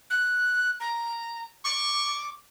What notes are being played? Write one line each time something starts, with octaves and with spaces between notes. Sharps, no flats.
F#6
A#5
C#6 D6